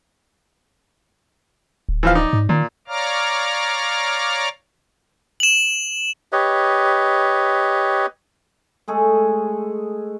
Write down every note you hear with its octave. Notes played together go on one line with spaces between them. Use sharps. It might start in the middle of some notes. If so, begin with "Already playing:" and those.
D1
E3 F3 F5
D#4 D5
G#2
A#2 D#3
C#5 D5 F5 A#5 D6 F6
E7 F#7
G4 B4 C#5 D#5
G#3 A3 G#4 A4